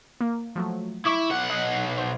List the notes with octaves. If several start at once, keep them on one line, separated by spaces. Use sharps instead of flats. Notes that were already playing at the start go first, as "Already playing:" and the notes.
A#3
F3 F#3 A3
E4 C#6 D6
B1 F#5
D#5
C5